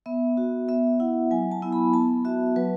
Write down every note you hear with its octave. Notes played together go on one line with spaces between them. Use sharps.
B3 E5
F#4
B3 E5
E4 F#5
F#3 G#5
A5
B3 E4
B5
B3 A5
F#4 E5
F#3 B4